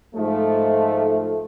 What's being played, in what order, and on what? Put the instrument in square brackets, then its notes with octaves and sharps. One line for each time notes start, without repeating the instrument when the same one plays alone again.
[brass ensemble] G#2 F3 A3